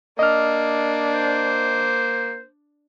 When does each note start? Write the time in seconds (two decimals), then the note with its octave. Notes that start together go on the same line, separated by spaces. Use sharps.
0.19 A#3 D4 D#5 F6
1.14 C5